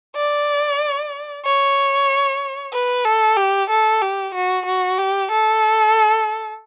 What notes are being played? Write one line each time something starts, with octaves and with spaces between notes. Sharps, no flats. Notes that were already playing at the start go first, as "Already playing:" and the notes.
D5
C#5
B4
A4
G4
A4
G4
F#4
F#4
G4
A4